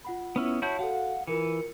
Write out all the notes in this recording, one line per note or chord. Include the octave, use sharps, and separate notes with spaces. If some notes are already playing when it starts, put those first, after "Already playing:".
F4 F#5 B5
B3 C#4 E4
E4 F#4 C#5 A5 G6
F#4 A4 F5 F#5
E3 F4 A#4 C#7